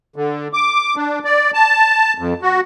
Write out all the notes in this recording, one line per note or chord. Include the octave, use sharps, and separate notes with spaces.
D3
D6
D4
D5
A5
F2
F#4